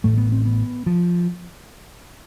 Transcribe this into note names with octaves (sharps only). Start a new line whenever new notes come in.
A1 A2 A3
B3
C4
B3
F3